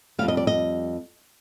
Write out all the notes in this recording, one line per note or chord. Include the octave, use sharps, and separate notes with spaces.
F2 C3 G3 F5
D#5
D5
D#5